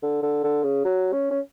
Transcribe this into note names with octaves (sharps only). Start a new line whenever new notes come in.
D3
D3
D3
C#3
F#3
C#4
C#4